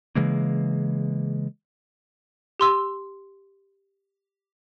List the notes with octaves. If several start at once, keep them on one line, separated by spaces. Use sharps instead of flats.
C#3 E3 G#3 A#3
G4 C6 E6